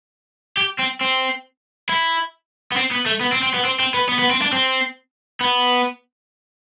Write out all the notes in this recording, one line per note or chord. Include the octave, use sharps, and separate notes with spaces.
G4
C4
C4
E4
B3
C4
B3
A3
B3
C4
C4
B3
C4
C4
B3
B3
B3
C4
D4
C4
B3